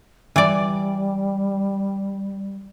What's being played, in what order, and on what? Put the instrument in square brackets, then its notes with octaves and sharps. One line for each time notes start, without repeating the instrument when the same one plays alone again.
[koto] E3 D5 [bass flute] G3